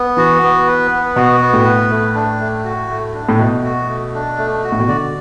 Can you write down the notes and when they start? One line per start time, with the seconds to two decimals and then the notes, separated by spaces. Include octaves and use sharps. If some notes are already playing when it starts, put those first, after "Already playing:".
Already playing: B3
0.17 E3 F#4
0.42 B3
0.67 B4
0.91 B3
1.16 B2 F#4
1.41 B3
1.54 A2
1.65 B4
1.90 A3
2.15 D4
2.40 A3
2.64 F#4
2.89 A3
3.14 D4
3.29 A2
3.39 B2 A3
3.63 F#4
3.89 A3
4.14 D4
4.38 A3
4.64 F#4
4.72 A2
4.80 B2
4.87 D3 D5